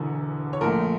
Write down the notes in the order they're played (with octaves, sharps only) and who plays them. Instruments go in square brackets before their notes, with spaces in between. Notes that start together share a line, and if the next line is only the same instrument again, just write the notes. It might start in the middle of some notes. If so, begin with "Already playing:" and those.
Already playing: [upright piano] E1 E2 D3
C#5
A#1 A#2 A3 A#4